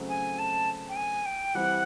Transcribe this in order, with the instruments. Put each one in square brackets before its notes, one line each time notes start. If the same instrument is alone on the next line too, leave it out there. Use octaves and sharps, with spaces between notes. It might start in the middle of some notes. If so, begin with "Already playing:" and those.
Already playing: [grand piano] C#3 F#3 A3 C4
[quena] G#5
A5
G5
G#5
G5
[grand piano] E3 G3 C4 E4 [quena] F#5